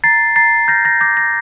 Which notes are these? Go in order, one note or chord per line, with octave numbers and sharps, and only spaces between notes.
A#5 A6 C7
A#5 A6 C7
F6 G6 A#6
G6 A#6
D6 G6 A#6
G6 A#6